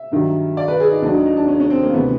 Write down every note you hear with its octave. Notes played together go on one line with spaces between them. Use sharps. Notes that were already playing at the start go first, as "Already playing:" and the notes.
Already playing: E5
G2 D#3 F#3
D5
B4
G#4
D#4
D#2 D#3 F#3 D4
D#4
D#4
D4
C#4
C#4
C4
A#3
D2 C3 E3 B3